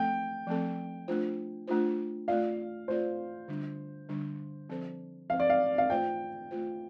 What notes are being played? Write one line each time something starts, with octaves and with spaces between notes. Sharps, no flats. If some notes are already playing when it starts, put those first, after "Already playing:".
Already playing: F3 A3 C4 A4 G5
F3 A3 C4 A4
A3 D4 F4 C5
A3 D4 F4 C5
A3 F4 D5 F5
A3 F4 C5 D5
D3 G3 D4
D3 G3 D4
F3 C4 A4 C5
F3 C4 A4 C5 F5
D5
F5
F5
A3 F4 C5 G5
A3 F4 C5